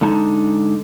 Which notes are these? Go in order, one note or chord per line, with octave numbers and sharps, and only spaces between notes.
D3 G#3 D#4 A5